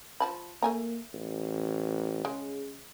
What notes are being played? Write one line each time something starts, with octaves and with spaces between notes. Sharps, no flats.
F3 A5 B5
A3 A#3 G#5 A#5
A1
C#3 G#3